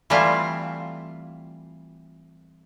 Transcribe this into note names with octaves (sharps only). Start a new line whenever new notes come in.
E3 G3 A3 C4 E4 F4